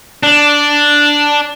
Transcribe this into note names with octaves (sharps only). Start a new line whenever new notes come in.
D4